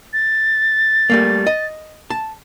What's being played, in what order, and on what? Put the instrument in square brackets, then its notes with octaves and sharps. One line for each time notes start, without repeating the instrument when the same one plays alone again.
[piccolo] A6
[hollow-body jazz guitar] G3 A3 A#3
D#5
A5